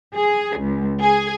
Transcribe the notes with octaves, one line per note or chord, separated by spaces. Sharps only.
G#4
C#2
G#4